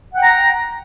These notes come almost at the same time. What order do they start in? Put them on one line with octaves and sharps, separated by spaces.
F#5 G5 A#5